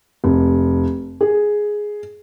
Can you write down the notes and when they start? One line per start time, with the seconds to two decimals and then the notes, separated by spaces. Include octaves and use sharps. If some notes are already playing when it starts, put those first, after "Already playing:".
0.24 F1
1.21 G#4